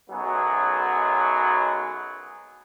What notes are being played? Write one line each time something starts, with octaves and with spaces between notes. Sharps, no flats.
B1 F#2 F#3 G#3 B3 G#4